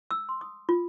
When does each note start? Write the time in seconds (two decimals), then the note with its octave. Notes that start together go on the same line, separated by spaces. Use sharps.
0.11 E6
0.29 C6
0.41 D#6
0.69 F4